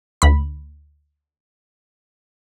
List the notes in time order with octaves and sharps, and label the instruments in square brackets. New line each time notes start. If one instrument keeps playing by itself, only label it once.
[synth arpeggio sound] D2 B5